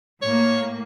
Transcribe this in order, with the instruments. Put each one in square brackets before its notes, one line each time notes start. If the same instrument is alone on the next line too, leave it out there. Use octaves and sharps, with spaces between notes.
[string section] A2 A#3 [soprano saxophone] C#5